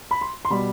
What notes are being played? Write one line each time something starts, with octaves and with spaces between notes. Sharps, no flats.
B5
C6
C6
B2 G3 B5